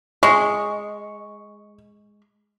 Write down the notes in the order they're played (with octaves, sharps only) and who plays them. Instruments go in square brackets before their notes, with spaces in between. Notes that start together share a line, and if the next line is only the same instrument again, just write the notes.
[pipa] G#3 [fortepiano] C#6